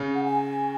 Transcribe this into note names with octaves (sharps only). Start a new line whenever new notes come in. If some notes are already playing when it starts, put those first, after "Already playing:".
Already playing: C#3
F#5
G#5